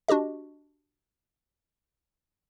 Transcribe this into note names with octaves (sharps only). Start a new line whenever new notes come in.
D4 F#4 G4 D#5